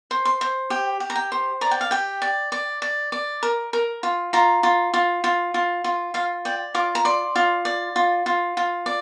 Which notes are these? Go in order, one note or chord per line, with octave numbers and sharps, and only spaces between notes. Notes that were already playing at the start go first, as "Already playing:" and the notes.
C5
C6
C5
G4 G5
G4
A#5
G5
C5
D5 A#5
G5
F5
G4 G5
D5
D5
D5
D5
A#4
A#4
F4
F4 A#5
F4
F4
F4
F4
F4
F4 F5
D5 G5
F4 D6
A#5
D5 C6
F4
D5
F4
F4
F4
D5